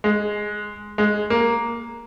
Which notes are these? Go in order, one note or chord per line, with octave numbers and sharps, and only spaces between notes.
G#3
G#3
A#3